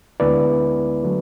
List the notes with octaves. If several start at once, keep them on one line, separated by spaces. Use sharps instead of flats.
D2 D3 G#3 B3 E4 B4 D5
D3 F#3 A3